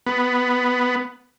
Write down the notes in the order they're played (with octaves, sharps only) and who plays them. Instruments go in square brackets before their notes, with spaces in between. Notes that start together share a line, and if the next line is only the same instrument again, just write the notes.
[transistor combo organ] B3